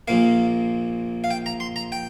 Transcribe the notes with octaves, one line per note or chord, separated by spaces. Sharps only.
A#1 A#2 A#3 F5
F5
G5
A#5
C6
A#5
G5